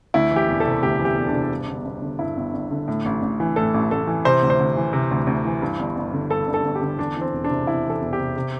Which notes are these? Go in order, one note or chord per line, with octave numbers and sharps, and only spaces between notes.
D2 E4
E3 G4
E1
C3 A4
D2 G4
E3
G4
E1
D4
C3
G2
G1
G1
D3
G2 E4
G1
G1
D3
A2
A1
A1
E3
A2 A4
A1
A1 A4
E3
C3 C5
D2
C5
D2
E3
C3
D2
D2
E3
G2
G1
G1
D3
G2 A4
G1
A4
G1
G4
D3
E2 D4
E3 C4
E1
D4
C3
E2 E4
E3 A4
E1
G4
C3
C3